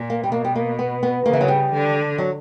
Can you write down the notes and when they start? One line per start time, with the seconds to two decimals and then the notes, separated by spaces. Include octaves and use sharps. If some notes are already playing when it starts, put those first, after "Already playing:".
Already playing: A#2
0.10 A#3
0.24 G3
0.32 B2 A#3
0.45 G3
0.55 A#3
0.79 B3
1.03 B3
1.25 C#3 A#3
1.33 E3
1.41 F#3
1.48 G3
1.72 D3
2.18 F#3